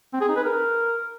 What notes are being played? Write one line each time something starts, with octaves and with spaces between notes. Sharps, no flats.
C4
G#4
D#4
B4
A#4